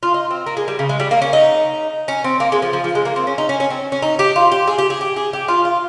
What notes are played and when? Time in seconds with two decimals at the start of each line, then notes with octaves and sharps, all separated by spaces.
0.03 F4
0.14 D#4
0.31 C4
0.46 A#3
0.57 G#3
0.68 G3
0.79 C#3
0.89 G#3
1.00 G3
1.11 A#3
1.22 C#4
1.33 D#4
2.08 C#4
2.24 C4
2.40 A#3
2.52 G#3
2.62 F3
2.73 F3
2.84 F3
2.95 G#3
3.05 A#3
3.16 C4
3.27 C#4
3.38 D#4
3.49 C#4
3.60 C#4
3.70 C4
3.92 C#4
4.02 D#4
4.19 G4
4.36 F4
4.52 G4
4.68 G#4
4.78 G4
4.90 G#4
5.01 G4
5.16 G#4
5.33 G4
5.48 F4
5.65 F4